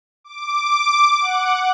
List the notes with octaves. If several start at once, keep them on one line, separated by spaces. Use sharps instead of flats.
D6
F#5